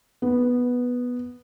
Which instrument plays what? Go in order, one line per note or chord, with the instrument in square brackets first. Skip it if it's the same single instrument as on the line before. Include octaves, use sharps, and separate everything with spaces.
[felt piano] B3